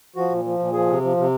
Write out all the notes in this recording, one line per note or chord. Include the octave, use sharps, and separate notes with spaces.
F3 F#4
A#2
F3
A#2
F3 G#4
C3
F3
C3